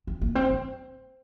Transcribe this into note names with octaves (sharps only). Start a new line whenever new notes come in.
C4
A#3
C4
C4